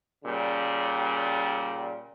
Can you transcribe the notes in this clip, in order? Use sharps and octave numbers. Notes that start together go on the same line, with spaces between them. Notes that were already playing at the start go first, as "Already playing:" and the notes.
A#2 C#3 G3